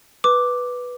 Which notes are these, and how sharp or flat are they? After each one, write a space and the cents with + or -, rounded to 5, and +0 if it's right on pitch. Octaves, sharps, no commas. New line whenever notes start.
B4 -5 D6 +0